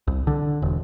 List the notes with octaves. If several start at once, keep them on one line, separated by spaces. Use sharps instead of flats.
C2
D3
E1